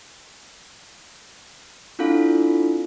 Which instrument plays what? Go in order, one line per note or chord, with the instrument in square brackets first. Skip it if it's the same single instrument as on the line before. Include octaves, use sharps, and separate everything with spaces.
[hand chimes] C4 D4 E4 F4 A4 F5